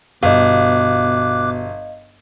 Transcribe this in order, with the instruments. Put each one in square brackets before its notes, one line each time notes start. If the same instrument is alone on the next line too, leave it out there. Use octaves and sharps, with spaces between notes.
[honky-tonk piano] G1 [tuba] B2 [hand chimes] D#5 F5 [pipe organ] D6 F#6